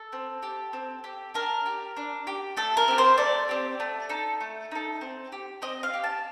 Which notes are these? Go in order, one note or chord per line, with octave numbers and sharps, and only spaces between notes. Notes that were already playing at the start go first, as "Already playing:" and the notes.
Already playing: A4
C4
G4
C4
G4
D4 A#4
G4
D4
G4
A3 A4
A#4
C4 G4
C5
A3 D5
C4 G4
A3
D#4 A4
A3
D#4 A4
C4
G4
C4 D#5
F5
G4
A5